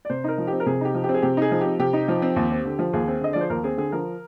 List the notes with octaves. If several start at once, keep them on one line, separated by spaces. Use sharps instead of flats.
D5
C3 C5
D#4 A#4
F3
G4
C4
A#4
C3 G#4
D#4 G4
F3
G4
C4
G#4
C3 G4
D#4 G#4
F3
C4 G4
C3 G4
D#4
F3
C4
D#2
C4
D3
F3
D#2 G#4
C4
D3 D#5
F3 D5
C5
D#2 A#4
C4 G#4
D3 G#4
F3 A#4